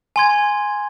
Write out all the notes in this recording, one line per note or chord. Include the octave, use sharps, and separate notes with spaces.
G#5 C6 G#6